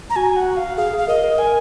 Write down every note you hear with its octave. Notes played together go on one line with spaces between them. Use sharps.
A#5
F#4 G#5
F#5
F5
G#4 F5
G#4
F5
A#4 D#5
A#4
A#4 G#5